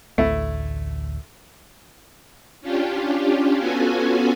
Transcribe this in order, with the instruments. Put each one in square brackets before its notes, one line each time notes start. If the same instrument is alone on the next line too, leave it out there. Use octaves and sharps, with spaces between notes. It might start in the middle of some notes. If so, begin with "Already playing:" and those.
[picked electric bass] A1 D2 [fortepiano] A3 E4
[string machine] C#4 D4 F4 G4
B3 C#4 F4 F#4 A4 G#5